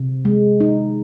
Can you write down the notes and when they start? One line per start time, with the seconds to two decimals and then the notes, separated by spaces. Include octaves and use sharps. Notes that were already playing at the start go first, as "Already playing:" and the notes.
Already playing: C3
0.25 G#3
0.60 D#4